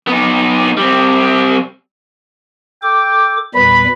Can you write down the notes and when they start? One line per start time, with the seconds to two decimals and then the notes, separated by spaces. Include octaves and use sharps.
0.07 B3 D#4
0.77 G3 C4
2.83 A4 G5 D6
3.54 E2 A#2 G3 B4 B5